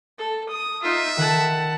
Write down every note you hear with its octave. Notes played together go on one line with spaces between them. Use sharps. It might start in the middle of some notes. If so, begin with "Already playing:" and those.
A4
D#6
D#4 F4 E5
D#3 F#5 A5